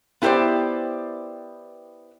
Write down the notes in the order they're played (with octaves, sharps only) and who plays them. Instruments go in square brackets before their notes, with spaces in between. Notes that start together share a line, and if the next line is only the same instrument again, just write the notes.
[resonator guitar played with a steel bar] B3 E4 G4 A#4 C5 D5